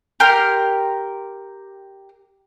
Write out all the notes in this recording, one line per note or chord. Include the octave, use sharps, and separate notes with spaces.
G4 A#4 C6 F6